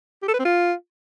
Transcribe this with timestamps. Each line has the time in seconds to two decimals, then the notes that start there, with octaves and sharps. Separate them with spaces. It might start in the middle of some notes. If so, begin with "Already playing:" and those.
0.22 G4
0.28 A4
0.34 B4
0.39 C4
0.45 F4